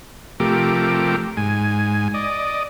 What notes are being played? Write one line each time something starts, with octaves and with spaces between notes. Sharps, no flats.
C3 F3 A3 G4 A#4 D6
G#2 G#5
D5 D#5